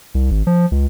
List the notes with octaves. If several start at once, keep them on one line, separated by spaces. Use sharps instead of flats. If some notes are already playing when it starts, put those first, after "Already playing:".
C2
G#1
F3
C#2